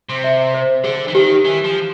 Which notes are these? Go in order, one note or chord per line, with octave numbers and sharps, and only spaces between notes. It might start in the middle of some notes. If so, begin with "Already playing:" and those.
C3
E5
C5
D3 G#4
E3
D#3 G4
E3
F3